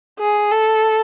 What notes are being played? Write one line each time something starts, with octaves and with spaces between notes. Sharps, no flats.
G#4
A4